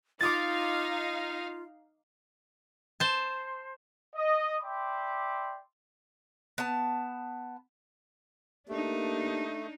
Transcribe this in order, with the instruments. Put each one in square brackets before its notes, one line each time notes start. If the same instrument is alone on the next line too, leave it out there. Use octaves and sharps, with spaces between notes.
[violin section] D#4 F5 [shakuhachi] F4 [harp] D6 D#6 A6
[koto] C5 A5
[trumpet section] D#5
D5 E5 G5 B5 C6 D6
[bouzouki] B3 A5
[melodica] A3 [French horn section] A#3 G4 [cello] D4 D#4